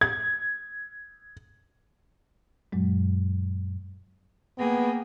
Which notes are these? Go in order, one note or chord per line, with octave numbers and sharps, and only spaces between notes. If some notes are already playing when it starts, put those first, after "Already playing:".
G#6
F#2 A#2 F#3 G#3
A#3 B3 G#4 G5